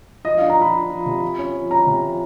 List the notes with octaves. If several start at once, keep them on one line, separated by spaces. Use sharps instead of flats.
F3 D#5
D4 F5
A#5
F3 B5
D4
F3
C3
F3
C#4
F3
C#4 A#5
C3
F3